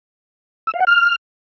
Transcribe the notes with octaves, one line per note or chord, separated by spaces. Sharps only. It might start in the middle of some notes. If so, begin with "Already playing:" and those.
E6
F5
F#5
F6